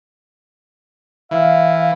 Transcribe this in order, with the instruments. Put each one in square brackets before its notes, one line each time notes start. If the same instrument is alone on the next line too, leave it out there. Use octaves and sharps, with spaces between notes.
[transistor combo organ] E3 [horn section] E5 F5